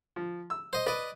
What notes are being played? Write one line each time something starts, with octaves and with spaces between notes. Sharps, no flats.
F3
E6
C5 D#5
B4 D5 D#5